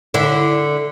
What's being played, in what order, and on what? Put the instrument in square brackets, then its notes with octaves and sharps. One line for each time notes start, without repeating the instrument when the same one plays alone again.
[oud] D3 E4